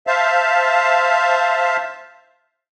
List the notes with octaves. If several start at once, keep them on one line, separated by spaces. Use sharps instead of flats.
C5 E5 F5 A5